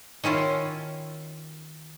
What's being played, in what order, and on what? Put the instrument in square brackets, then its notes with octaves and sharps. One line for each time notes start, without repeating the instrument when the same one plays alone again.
[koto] D#3 C#4 E4 F4